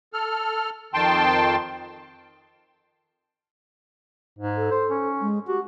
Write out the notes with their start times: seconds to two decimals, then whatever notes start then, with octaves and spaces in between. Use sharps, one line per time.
0.13 A4 F6
0.94 F2 D#3 G5 A5 C6
4.39 G#2
4.56 A4
4.71 C5
4.91 C#4
5.21 G#3
5.47 F#4 G4